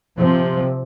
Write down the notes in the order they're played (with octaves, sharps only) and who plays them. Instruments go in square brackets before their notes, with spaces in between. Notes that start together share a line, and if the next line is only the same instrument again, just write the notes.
[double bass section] C3 F3 C4